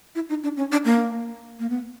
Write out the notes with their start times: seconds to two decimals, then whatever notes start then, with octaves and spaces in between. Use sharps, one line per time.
0.15 E4
0.29 D#4
0.43 D4
0.57 C#4
0.72 D4
0.85 A#3
1.60 A#3
1.70 B3